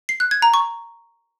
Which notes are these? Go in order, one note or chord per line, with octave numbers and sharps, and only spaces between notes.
C7
F#6
G#6
A#5
C#6